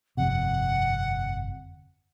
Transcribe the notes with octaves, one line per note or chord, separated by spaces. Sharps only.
G1 F2 C3 F#5